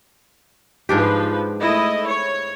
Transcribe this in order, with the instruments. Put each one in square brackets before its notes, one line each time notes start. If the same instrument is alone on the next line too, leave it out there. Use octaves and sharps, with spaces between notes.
[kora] G#2 D4 G4 [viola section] F3 B4
[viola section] A3 E4 D#5
C#5